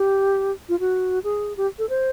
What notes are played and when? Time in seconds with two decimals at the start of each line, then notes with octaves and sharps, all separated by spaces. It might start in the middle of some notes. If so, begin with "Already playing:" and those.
Already playing: G4
0.69 F4
0.80 F#4
1.24 G#4
1.57 G4
1.79 A4
1.89 C5